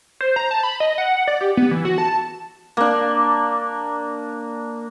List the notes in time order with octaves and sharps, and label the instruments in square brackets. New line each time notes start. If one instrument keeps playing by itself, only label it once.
[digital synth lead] C5
A#5
A5
B5
D#5
F#5
D5
G4
B3
E3
F#4
A5
[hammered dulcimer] A#3 D4